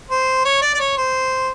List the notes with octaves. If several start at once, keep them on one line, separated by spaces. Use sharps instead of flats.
C5
C#5
D5
D5
C#5
C5